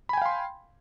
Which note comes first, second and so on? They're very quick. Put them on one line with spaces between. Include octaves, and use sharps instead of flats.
B5 G#5 G5 F5 C6